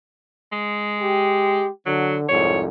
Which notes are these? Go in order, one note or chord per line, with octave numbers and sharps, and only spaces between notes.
G#3
G4
D3 F#3
C2 F2 G#2 C#5